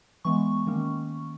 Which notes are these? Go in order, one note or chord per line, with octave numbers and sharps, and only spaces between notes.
E3 G#3 B3 C#6
D#3 A#3 C#4